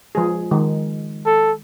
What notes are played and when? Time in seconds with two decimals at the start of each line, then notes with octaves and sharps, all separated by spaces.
0.15 F3 G#3 G#4
0.51 D#3 G#3
1.26 A4